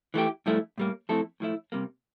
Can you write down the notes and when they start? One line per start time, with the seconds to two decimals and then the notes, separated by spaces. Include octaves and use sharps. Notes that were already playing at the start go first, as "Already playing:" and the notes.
0.14 E3 A3 E4 G4
0.46 G2 F3 A3 E4
0.78 A2 G3 A#3
1.09 F3 A3 C4 E4 A4
1.40 A2 F3 A3 E4
1.72 C3 G3 A#3